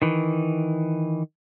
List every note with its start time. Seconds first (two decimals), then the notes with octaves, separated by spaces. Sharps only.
0.02 D#3 E3